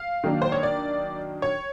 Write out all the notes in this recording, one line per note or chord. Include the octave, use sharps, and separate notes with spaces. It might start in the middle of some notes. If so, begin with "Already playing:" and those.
Already playing: F5
D#3 F#3 A#3 D4
C5
C#5
D5
C#5